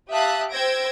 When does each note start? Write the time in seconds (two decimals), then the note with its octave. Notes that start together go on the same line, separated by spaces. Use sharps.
0.11 G4 E5 F5 A5 D#6 F#6
0.52 C5 G5 E6 G#6 A#6 D7